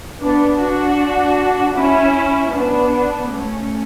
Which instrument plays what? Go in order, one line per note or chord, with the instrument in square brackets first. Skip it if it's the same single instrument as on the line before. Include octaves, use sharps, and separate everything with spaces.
[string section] B3 D4
D4 F#4
C#4 E4
B3 D4
A3 C#4